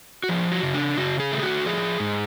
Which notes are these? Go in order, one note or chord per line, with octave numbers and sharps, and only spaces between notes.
F#4
F3 G#4
F#4
C#3
D4
C#3 F#4
G#4
A3
G#4
F#4
F3 G#4
G#2